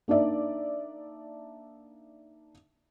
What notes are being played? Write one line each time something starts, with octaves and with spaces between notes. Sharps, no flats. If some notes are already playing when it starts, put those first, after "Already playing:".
A#3 D4 D#4 D5 E5